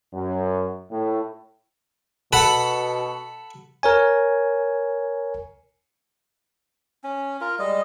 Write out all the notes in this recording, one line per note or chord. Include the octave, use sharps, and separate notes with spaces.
F#2
A2
B2 A4 F#5 B5
A#4 C#5 G#5
C#4
F4 A#4
G3 G#3 D#5